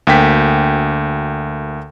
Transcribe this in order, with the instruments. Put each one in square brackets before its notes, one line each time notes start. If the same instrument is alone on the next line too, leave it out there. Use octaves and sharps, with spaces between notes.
[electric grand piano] D2 A#3 G5 B6